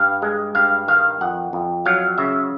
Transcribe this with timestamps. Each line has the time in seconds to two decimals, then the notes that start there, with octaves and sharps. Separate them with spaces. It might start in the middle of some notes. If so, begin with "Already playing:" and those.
Already playing: G2 F5
0.22 G#3
0.55 G2 F5
0.88 D#3 F5
1.21 F2 F#5
1.53 F2
1.86 F#3 F5
2.18 C#3 E5